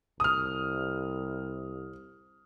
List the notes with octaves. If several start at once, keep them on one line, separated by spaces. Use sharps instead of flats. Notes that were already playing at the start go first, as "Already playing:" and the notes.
C2 D#6 F6